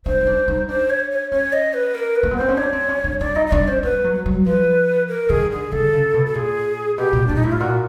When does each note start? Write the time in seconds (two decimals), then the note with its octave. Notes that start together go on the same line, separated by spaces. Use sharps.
0.06 D4 C5
0.21 D#4
0.27 D4
0.48 D#4
0.68 D4 C5
0.90 C#5
1.11 C#5
1.31 C#4 C#5
1.53 D#5
1.74 B4
1.95 A#4
2.16 B4
2.23 A#3
2.31 B3
2.37 C4 C5
2.49 C#4
2.57 D4 C#5
2.73 C4
2.89 C#4
3.04 D4
3.20 D4 D5
3.35 D#4 D#5
3.47 D#5
3.51 D4 D5
3.67 C#4 C5
3.83 B3 B4
4.04 F#3
4.26 F#3
4.46 F3 B4
5.09 A#4
5.30 D#3 G#4
5.51 D3 G#4
5.72 D3 A4
5.93 C#3
6.14 B2
6.26 A4
6.35 A#2 G#4
6.98 B2 G4
7.13 A#2
7.27 A#2 D4
7.35 D#4
7.44 A2 E4
7.52 F4
7.60 A#2 F#4